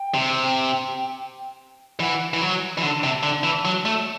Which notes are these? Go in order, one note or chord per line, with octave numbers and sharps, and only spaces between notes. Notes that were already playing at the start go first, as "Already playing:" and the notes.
Already playing: G5
C3
E3 F#5
E3
F#3
E3
D3 A5
C3
D3
E3
F#3
A3